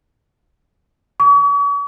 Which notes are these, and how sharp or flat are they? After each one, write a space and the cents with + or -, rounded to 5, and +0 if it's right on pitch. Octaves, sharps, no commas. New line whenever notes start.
C#6 +45